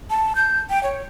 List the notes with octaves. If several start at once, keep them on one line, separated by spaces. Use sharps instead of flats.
A5
G6
G5
C#5